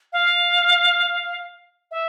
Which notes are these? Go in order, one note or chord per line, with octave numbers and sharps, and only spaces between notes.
F5
E5